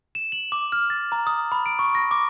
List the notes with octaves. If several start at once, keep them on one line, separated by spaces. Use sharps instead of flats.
E7
F#7
D6
F6
A6
A#5
D#6
B5
D7
C#6
A#6
D6